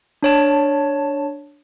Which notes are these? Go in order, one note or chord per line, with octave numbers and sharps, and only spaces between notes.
D4 C#5 A5